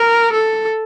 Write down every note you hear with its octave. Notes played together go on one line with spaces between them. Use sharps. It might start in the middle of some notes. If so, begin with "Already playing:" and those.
Already playing: A#4
A4